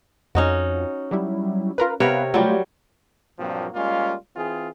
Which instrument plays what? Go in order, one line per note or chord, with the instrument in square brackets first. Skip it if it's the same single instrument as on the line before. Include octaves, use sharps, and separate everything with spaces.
[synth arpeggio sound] F2 [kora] C#4 D#4 F#4
[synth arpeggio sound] F#3 G3 E4
F4 A#4 B4
[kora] C3 A#4 C#5 [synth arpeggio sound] B3 B4 F5
[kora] F#3 G3 [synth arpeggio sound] A3 F4 G4
[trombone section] G2 A#2 F3 F#3 A#3 C4
G3 G#3 A#3 C#4 F4
E3 C4 F4 G#4